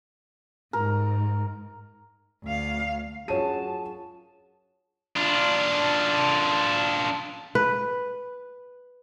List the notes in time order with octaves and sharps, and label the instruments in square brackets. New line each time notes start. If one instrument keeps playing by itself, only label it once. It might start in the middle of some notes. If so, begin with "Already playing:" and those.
[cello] G#2 [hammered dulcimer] A#4
[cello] D2 F5
[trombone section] F#2 F#4 [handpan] D4 F4 G#4 [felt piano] C#5 D#7 [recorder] A5
[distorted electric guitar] D4 F4
[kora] B4